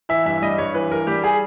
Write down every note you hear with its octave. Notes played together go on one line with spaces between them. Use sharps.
E3 E5
G2 E5
E5
G3 D#5
G2 C#5
E3 B4
G2 A#4
G3 G4
G#4